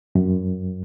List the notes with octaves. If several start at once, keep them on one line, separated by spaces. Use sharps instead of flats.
F#2